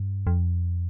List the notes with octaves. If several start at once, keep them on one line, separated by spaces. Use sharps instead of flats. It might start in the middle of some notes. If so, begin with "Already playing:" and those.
Already playing: G2
F2